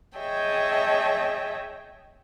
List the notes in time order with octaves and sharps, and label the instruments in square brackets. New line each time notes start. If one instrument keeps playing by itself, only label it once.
[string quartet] G#4 C#5 D#5 E5 G5 A5